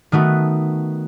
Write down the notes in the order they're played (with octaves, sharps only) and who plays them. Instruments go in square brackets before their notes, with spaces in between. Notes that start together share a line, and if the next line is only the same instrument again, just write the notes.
[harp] D#3 A3 B3 F#4